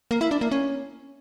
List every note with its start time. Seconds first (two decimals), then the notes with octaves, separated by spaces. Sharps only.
0.11 A#3
0.21 E4
0.31 D4
0.41 A#3
0.51 C#4